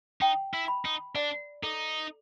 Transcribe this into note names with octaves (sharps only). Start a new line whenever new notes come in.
D#4 G5
E4
B5
D#4
D4 D5
D#4 A4